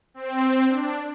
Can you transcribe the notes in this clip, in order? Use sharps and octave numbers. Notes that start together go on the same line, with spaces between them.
C4
D4